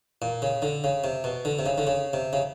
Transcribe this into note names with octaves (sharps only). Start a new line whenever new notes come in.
A#2
C#3
D3
C#3
C3
B2
D3
C3
C#3
D3
C#3
C3
C#3